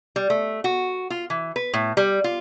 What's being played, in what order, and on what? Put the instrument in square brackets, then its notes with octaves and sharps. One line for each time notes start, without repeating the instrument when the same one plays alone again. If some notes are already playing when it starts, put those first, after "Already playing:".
[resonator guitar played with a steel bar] G3
A3
F#4
F4
E3
B4
A2
G3
F4